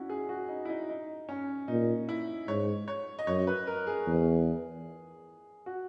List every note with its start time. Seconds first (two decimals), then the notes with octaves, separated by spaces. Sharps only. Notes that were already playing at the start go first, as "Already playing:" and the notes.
Already playing: C#4 D#4 E4 F#4
0.09 G#4
0.29 F#4
0.49 D#4
0.65 E4
0.70 D#4
0.90 D#4
1.29 C#4
1.68 A#2 D#4
2.09 E4
2.48 G#2 C#5
2.88 C#5
3.19 D#5
3.27 F#2 C#5
3.47 B4
3.67 A#4
3.87 G#4
4.07 E2
5.66 F#4